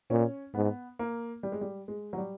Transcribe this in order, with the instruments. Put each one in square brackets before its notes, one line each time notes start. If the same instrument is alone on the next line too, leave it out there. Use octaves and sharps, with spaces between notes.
[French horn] A#2 [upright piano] C#4
[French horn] G#2 [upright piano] B3
[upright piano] A#3
G3
G#3
G3
G#3
F#3
G3